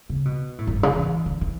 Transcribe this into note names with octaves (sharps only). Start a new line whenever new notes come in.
C#3
B2
A2
F#2
G2
C#3
E3
D3
E3